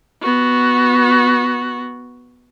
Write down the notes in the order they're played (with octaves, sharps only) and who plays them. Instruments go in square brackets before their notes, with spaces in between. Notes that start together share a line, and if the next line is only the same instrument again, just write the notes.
[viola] B3 F#4